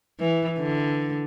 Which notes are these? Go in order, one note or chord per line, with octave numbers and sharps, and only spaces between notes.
E3
D3